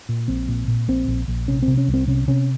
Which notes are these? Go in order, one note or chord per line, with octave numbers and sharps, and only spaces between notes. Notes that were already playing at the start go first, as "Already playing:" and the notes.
A#2
A#1 C4
A#2
A#2
A#1 C4
A#1
A#1
C3 C#4
C4
C3
C#4
C2
C4
C3 C#4
C3 C#4